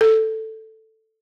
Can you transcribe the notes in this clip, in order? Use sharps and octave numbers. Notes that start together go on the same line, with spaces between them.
A4